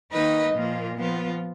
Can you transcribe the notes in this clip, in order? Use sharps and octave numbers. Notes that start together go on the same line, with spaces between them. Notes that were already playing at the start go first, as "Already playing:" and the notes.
D#3 A#3 D#4 B4 D#5
A#2 F3 A#3 F4
F3 B3 F4